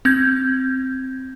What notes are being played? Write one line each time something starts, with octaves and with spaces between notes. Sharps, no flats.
C4 G6 G#6